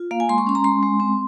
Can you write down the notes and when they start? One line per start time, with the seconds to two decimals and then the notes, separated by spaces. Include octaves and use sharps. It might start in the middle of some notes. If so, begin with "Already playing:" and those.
Already playing: F4
0.11 A#3 F5
0.20 G#5
0.29 G#3 C6
0.38 C#6
0.47 C#4 C6
0.55 A#5
0.64 G#3 C6
0.83 G#3
1.00 C4